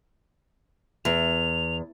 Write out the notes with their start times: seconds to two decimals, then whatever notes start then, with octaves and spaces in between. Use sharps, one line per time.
1.05 E2 F7